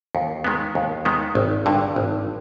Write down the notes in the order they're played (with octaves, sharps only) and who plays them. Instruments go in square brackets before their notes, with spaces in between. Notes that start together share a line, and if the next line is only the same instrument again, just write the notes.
[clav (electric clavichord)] D#2
D#3 G#3 B3
D#2
D#3 G#3 B3
G#1
G2 D3
G#1